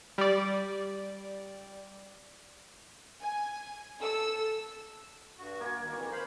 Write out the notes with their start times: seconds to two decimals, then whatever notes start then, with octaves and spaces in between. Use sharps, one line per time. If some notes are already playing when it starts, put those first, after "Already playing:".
0.18 G3 D5
3.22 G#5
4.00 A4 E6
5.38 G2 F#4
5.60 A#3 G#5
5.76 D#2
5.93 F2 E3 C#6
6.12 C5 F5 B5